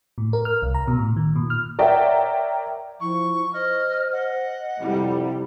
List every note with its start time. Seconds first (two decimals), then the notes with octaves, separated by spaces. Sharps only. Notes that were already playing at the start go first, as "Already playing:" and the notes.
0.18 A2
0.33 A#4
0.45 F6
0.62 C2
0.74 A#5
0.88 B2
0.99 A2
1.16 D#3
1.36 A#2
1.50 F6
1.79 A#4 C#5 D5 E5 F#5 G5
3.00 F3 E4 C#6
3.53 C5 D#5 F6
4.13 D#5 F#5
4.81 F2 C3 G3 D#4 E4